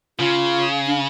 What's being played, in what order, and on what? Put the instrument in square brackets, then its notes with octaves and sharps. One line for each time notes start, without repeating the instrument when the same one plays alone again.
[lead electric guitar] C#3 [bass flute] F4
[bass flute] D4